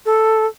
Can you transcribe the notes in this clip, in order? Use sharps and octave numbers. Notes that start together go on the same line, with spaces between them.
A4